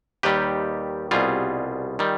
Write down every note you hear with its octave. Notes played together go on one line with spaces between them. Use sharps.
D#2 D#3 G3 G4 B4
C2 B2 G3 F4 G#4
D#3 G3